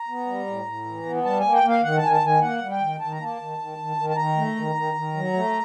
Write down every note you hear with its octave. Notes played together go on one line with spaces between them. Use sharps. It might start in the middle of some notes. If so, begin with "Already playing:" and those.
Already playing: A#5
B3
G3
A2
A2
E3
B3
G3 A5
A#3 G#5
G5
A#3
F5
D#3 F#5
A5
D#3 G#5
A5
D#3 G#5
A#3 F#5
G3
G5
D#3
D#3 A5
A#5
A#3 A5
D#3
D#3
D#3
D#3
A5
D#3 A#5
A3
D#3
D#3
D#3
F#3
A3